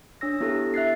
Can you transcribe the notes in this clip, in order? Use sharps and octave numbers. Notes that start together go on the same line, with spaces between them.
D4 C#5 E6 A#6
B3 E4 G4 A4
E5 F#6 A6 C7